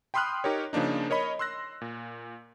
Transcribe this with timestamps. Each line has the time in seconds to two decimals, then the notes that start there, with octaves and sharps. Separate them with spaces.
0.14 G5 B5 C6 D#6 F6 F#6
0.44 D#4 G4 A#4 C#5
0.73 C#3 F3 A#3 D4 D#4
1.10 A#4 C#5 D#5 B5
1.39 C6 E6 F#6 A#6
1.81 A#2